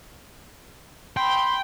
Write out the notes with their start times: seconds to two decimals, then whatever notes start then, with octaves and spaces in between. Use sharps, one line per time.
1.17 G5 B5 C6